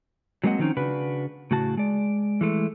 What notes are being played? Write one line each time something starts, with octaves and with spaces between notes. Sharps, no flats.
F#3 G#3 A#3 C4 D#5 F#5
D3 D#3 F3 C4 C#4 D#4
C#3 D4 F#4 B4
A2 C#3 F#4 A5
G#3 D5
E3 G#3 A3